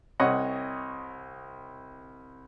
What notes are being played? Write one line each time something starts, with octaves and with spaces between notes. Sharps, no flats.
C2 C#5 D#5 F#5